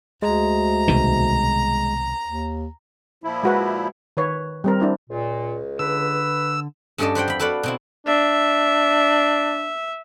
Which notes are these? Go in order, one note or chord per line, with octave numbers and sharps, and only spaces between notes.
D2 G#3 A#5
C2 B2 D#3
D#2
A#2 F3 E4
G#3 F#4 B4
D#3 B4 C#5
G3 C4 A#4
D4 E4 C5
C#2 A#2
D3 B4 B5 E6
G2 C#4 A4 D5 D#5 A5
B4 C5 F#5 G5
F2 B5
F#4 A4 B4 D5 F5 F#5
B2 C4 E4
D4 E5